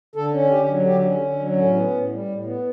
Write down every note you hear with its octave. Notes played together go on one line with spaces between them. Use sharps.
D3 A4
C#4
D3 G4
F#3
D3 G4
C#4
D3
F#3
A2 C#4
B3
A2
G3
A2
B3